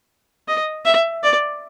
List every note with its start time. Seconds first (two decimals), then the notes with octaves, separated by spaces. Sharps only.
0.48 D#5
0.85 E5
1.23 D5